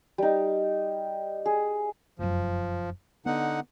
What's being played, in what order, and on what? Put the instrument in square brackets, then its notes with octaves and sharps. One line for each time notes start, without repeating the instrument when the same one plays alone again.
[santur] G3 D#4
G#4
[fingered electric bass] F1 F#2 [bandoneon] F3
[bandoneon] D3 D#4 F#5 [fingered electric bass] B3